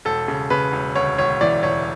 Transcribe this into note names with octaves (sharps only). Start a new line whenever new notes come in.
E1 A4
C#3
C#3 B4
E1
D2 C#5
E1 C#5
E3 D5
E1 C#5